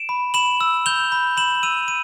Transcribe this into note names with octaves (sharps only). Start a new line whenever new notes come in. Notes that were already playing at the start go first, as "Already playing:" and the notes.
Already playing: D7 E7
B5
B5 E7 F#7
E6
G6 F7 G7
B5
B5 E7 F#7
E6 D#7 F7
D#7